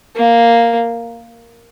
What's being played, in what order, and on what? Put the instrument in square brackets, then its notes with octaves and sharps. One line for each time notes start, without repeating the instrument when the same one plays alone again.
[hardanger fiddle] A#3